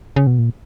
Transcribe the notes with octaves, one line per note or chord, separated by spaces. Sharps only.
C#3
B2
A#2